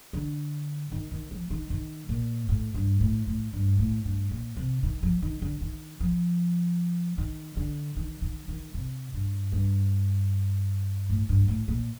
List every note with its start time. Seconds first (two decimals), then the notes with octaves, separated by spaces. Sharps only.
0.13 D3
0.92 D#3
1.11 D#3
1.31 F3
1.50 D#3
1.70 D#3
2.09 A#2
2.49 A2
2.75 G2
3.01 A2
3.27 A2
3.53 G2
3.79 A2
4.05 G2
4.31 A#2
4.56 C3
4.83 D#3
5.03 F3
5.22 D#3
5.42 D3
5.61 D#3
6.00 F3
7.18 D#3
7.57 D3
7.97 D#3
8.22 D#3
8.48 D#3
8.74 C3
9.14 G2
9.52 G2
11.10 A2
11.29 G2
11.48 A2
11.68 A#2